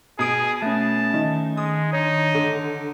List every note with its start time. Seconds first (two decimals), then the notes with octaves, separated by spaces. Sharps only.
0.19 B2 G#4 D#6 D7
0.62 A3 C#4 A5
1.14 D#3
1.57 G#3 D#6
1.93 D4 D#4 C#5
2.34 D3